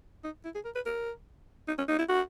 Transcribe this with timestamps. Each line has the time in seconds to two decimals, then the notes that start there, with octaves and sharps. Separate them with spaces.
0.24 D#4
0.45 E4
0.55 G#4
0.65 A#4
0.75 B4
0.86 A#4
1.68 D#4
1.78 C#4
1.89 D#4
1.99 E4
2.09 F#4